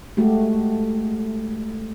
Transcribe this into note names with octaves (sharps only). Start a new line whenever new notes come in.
G#3 A3 F#4 G4